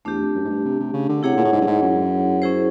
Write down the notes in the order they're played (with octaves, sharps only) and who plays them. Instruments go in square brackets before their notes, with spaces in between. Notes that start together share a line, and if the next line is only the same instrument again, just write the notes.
[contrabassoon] E2 [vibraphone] A3 D4 G4
[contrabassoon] F2
F#2
G#2
G2
C3
C3
C#3
D3
[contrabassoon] C3 [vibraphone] E4 G#4 C#5 F#5
[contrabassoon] A#2
A2
G#2
G2
G#2
F#2
[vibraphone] C#4 E4 G#4 C5